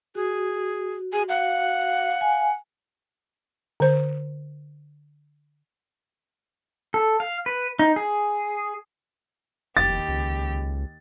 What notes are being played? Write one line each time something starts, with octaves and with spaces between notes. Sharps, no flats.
F#4 G#4
G#4 G#5
F5 F#5
G#5
D3 C5
A4
F5
B4
D#4
G#4
F1 D#2 G4 A6
C#2